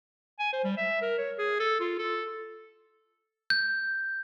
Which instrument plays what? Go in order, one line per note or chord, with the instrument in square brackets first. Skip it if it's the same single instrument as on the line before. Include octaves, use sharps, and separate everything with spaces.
[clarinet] G#5
C5
G3
E5
A#4
C#5
G#4
A4
F4
A4
[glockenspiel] G6